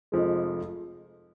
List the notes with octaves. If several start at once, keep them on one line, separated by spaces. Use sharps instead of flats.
F1 F2 F3 G#3